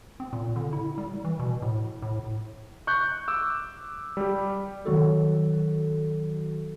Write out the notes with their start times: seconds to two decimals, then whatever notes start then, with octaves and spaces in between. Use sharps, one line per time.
0.20 C4
0.33 A#2
0.56 D3
0.73 E4
0.98 G3
1.25 E3
1.39 B2
1.62 A2
2.02 A2
2.87 C#6 F#6 G6
3.28 D6 E6
4.17 G3 G4
4.86 D#3 F#3 F#4 A4